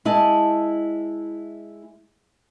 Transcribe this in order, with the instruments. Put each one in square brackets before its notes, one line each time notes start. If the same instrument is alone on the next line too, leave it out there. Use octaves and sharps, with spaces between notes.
[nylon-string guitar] G#3 E4 D#5 A5